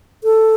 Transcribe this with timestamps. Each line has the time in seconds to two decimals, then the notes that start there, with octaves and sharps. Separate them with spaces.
0.24 A4